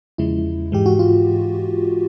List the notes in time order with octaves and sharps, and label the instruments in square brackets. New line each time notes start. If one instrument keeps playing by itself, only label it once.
[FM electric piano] E2 C#3 F3 G#3 E4
G#2 E3 G#3 G4
F#4
F4